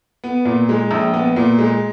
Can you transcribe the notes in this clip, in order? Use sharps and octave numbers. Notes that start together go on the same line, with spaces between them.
B3
A#2
G#3
A#1
B3
A#2
G#3